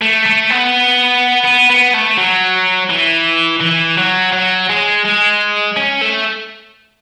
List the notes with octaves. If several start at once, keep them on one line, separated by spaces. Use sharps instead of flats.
A3
A3
B3
B3
B3
A3
F#3
E3
E3
F#3
F#3
G#3
G#3
C#4
A3